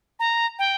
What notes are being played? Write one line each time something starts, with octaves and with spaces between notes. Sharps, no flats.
A#5
G5